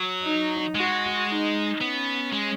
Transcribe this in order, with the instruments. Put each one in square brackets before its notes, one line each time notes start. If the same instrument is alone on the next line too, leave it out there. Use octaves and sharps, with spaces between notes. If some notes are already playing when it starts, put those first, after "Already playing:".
Already playing: [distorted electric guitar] F#3
[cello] D#4
[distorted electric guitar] G#3 [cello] F#4
[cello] D#4
[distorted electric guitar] B3 [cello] C#4
[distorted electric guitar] G#3